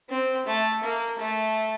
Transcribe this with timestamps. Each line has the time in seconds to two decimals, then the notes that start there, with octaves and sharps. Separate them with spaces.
0.10 C4
0.46 A3
0.83 A#3
1.19 A3